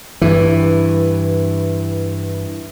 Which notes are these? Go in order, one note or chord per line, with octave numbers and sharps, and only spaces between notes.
G2 E3